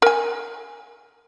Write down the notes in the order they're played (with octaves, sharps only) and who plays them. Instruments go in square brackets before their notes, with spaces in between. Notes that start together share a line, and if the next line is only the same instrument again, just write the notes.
[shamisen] A#4 G#5